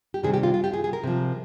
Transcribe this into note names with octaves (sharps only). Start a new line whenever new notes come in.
G4
C3 D#3 G3 G#4
G4
F4
F4
G4
G#4
G#4
A#4
C3 F3